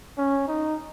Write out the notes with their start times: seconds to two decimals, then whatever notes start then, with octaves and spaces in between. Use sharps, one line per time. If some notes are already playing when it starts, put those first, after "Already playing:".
0.18 C#4
0.48 D#4